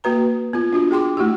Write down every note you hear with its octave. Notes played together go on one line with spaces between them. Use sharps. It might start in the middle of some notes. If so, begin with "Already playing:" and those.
A#3 F#4 B4 A#5
B3 F4
D4 F4 F#4
G#4 G5 C6 D6
A3 E4 F#4 G4